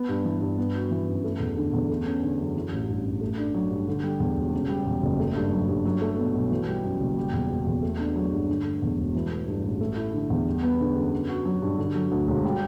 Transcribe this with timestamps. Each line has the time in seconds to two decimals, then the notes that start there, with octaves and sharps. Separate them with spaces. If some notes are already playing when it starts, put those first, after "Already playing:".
Already playing: B3
0.09 G2
0.25 E3
0.41 G2
0.58 B3
0.75 F#4
0.91 E3
1.07 F#2
1.24 A3
1.40 E2
1.57 D3
1.73 E2
1.90 A3
2.06 C#4
2.23 D3
2.39 F#2
2.56 E3
2.72 A1
2.88 G2
3.05 A1
3.21 A3
3.38 D4
3.54 F#3
3.71 G2
3.88 D3
4.03 G3
4.20 E2
4.37 E1
4.53 C#3
4.69 G3
4.86 E2
5.03 F#1
5.20 A3
5.35 G2
5.52 F#3
5.68 G2
5.85 F#3
6.02 A3
6.18 B2
6.34 B1
6.51 E3
6.68 G3
6.84 F#2
7.00 F#1
7.17 G3
7.33 E2
7.50 B2
7.67 E2
7.82 A3
8.00 D4
8.16 F#3
8.32 G2
8.49 D3
8.65 A3
8.82 E2
8.98 E1
9.15 E3
9.31 A3
9.48 G2
9.64 A1
9.81 A3
9.97 E4
10.13 D3
10.30 E2
10.47 G3
10.63 B3
10.80 D3
10.96 F#2
11.13 B3
11.29 F#4
11.45 F#3
11.62 G2
11.78 D3
11.95 F#3
12.11 D2
12.27 E1
12.45 G3